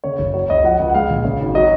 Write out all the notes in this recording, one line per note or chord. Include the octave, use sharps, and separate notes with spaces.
C#3 C#5
F#1
F#3 C#5
C#2 D#5
F3 F#5
C#2
F#5
G#3 F5
A#1
C#3
G#1
F#3 D#5